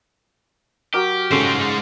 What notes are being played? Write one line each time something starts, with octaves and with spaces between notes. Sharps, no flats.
F#3 G4 A#4 D6
C#3 G#3 A4 C5